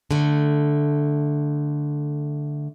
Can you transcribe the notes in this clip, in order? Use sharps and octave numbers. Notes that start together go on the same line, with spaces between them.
D3 A3